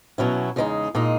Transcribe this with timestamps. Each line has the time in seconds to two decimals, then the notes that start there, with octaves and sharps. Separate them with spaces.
0.18 B2 F#3 C#4 E4
0.56 E2 C#3 G#3 B3 D#4
0.95 A#2 G#3 D#4